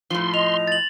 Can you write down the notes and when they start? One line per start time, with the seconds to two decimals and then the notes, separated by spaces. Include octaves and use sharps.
0.10 A2 F3 C6
0.34 D#5 F7
0.67 A6 F#7